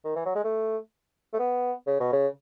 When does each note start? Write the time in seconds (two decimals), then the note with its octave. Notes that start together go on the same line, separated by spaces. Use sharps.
0.05 D#3
0.16 E3
0.26 F#3
0.35 G#3
0.44 A3
1.33 A3
1.40 B3
1.87 C#3
2.00 B2
2.12 C#3